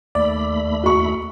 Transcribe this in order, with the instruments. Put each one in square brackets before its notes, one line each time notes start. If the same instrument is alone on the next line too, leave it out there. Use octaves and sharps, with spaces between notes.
[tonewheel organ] D#2 A3 B5 [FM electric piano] D5
[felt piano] F#4 C#6